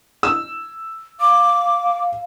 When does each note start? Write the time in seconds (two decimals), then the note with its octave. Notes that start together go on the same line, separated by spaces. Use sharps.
0.23 E6
1.20 F5 D6